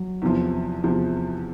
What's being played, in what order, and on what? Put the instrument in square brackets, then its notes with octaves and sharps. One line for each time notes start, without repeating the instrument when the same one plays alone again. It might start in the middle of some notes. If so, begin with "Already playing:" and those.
Already playing: [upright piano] F#3
[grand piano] E2 C3 F3
E2 C3 F3